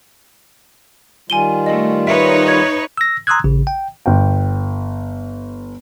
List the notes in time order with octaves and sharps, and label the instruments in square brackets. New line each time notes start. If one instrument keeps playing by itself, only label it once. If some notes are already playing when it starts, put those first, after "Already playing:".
[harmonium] D#3 G3 F4 [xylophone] G#5 D#7 G7
[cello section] A3 [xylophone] D#5
[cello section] D#4 B4 C#5 [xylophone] E5
[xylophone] G#6
[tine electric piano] E6 A#6
A#5 C6 D#6 E6 F#6 G#6
A1 C#3
G5
[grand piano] G1 G5